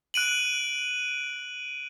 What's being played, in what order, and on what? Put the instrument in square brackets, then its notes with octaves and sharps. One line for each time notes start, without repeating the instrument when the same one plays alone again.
[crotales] F#6 D7 D#7 F#7